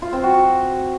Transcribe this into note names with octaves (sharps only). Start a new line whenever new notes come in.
F4
C4
F#4
F#4